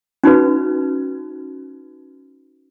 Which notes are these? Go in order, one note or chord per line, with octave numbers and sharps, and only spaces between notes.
C#4 D#4 F#4 B4